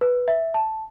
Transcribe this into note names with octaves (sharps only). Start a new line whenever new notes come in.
B4
E5
A5